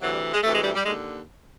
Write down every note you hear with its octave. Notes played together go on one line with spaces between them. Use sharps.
D2 C3 E3 F#3
G3
G#3
D2 C3 E3 A3
G#3
G3
G3
D#2 D3 G#3